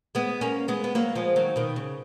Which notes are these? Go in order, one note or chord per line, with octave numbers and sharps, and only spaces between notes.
G#3 B3
A#3 C#4
G#3 B3
B3
F#3 A#3
F3 G#3
D#3 F#3
B2 D#3
C#3